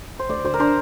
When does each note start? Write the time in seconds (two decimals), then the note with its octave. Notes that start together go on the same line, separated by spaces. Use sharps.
0.19 C5
0.29 D2 D5
0.45 D2 C5
0.54 A#4
0.60 D4 C5